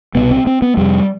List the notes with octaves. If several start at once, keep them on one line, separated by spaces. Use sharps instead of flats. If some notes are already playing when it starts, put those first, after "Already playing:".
C2 B2 B3
C4
C4
B3
F2 C3 G3